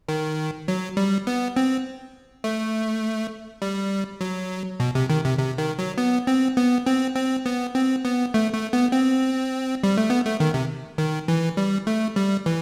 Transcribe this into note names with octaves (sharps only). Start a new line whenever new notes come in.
D#3
F#3
G3
B3
C4
A3
G3
F#3
B2
C3
D#3
C3
C3
D#3
F#3
B3
C4
B3
C4
C4
B3
C4
B3
A3
A3
B3
C4
G3
A3
B3
A3
D#3
C3
D#3
E3
G3
A3
G3
E3